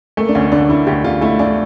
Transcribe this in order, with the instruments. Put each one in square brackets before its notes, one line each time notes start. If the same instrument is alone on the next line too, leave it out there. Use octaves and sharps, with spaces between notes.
[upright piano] A3 [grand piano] A#3
[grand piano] D4
[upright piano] D2 [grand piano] C#4
[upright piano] D3 [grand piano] D4
[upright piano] D3 [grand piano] E4
[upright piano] D2 [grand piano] G4
[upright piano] D3 [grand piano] F4
[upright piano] A3 [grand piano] E4
[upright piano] A3 [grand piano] D4